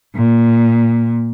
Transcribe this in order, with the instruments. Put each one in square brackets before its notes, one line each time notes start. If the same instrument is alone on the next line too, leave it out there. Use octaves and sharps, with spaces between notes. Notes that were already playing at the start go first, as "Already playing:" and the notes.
[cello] A#2